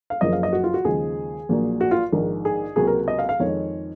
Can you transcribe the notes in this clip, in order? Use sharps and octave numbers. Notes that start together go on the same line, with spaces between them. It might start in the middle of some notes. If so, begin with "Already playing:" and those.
F5
F#1 F#2 C#3 F3 A#3 D#5
F5
D#5
F#4
F4
F#4
D#2 C#3 F3 G#3 G#4
A#1 A#2 F#3 A#3
F#4
F4
A#1 G#2 D#3 A#3
G#4
C#2 C3 F#3 A#3 G#4
A#4
D#5
F5
F5
F2 D#3 G#3 C#5